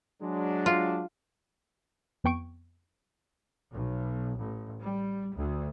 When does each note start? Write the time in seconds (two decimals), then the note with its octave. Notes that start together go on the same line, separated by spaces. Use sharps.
0.21 F#3 G#3 D4
0.66 F4
2.24 F2 B3 G5 C#6 D7
3.73 B1
4.40 A1
4.81 G3
5.36 D2